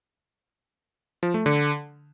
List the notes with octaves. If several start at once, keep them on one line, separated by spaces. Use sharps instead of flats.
F3
A3
D3